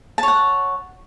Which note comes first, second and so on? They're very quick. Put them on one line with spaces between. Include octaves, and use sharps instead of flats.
A5 C#5 F#5